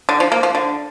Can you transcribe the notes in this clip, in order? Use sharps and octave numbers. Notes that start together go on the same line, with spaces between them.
D3
F3
A#3
F3
D3